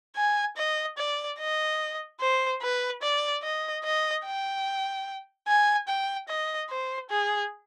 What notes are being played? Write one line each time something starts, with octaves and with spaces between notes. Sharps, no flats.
G#5
D#5
D5
D#5
C5
B4
D5
D#5
D#5
G5
G#5
G5
D#5
C5
G#4